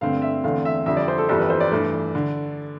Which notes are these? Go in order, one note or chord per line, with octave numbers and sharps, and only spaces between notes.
G2 D3 A3 C4 F5
E5
E2 D3 A3 C4 F5
E5
F2 D3 G3 E5
D5
C5
A4
G1 F2 E3 G3 A4
B4
C5
D5
G2 E3 A3
D3